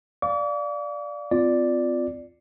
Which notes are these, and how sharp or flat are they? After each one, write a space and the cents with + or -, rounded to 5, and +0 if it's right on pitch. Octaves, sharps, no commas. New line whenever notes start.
D5 +0 F5 +0 D6 -45
C4 -35 F4 +0 D5 +0